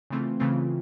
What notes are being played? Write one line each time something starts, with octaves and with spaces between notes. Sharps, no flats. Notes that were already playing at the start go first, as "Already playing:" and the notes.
C#3 E3 A3 C4 F4
C#3 E3 A3 C4 F4